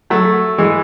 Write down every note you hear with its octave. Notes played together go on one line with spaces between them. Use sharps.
F#3 A3
E3 G#3